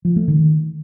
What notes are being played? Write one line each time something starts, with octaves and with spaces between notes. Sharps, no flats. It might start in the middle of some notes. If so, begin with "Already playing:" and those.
F3
A3
D#3